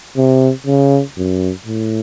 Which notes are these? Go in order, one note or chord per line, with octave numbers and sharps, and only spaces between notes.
C3
C#3
F#2
A2